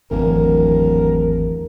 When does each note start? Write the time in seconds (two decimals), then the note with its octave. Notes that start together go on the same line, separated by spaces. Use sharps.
0.11 D1 G#1 E2 E3 A#4